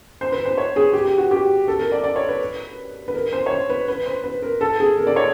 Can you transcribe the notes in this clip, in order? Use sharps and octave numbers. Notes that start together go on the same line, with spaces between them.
C5
B4
C5
C#5
G#4
G4
G4
F#4
G4
A4
A#4
D5
D5
C#5
B4
B4
A#4
C5
C#5
C5
B4
B4
C5
B4
A#4
A4
G#4
A#4
D5
C#5